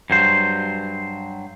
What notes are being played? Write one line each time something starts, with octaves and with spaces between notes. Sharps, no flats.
G2 F#3 C5